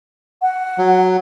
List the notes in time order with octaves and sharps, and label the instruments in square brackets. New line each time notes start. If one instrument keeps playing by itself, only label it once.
[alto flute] F#5
[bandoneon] F#3